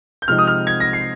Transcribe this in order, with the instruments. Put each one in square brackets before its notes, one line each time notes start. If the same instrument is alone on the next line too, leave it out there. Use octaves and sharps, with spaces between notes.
[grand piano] G6
C3 F3 G#3 C4 D#4 F6
D#6
F6
G#6
A#6
C7